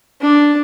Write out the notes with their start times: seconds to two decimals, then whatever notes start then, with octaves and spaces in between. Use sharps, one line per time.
0.21 D4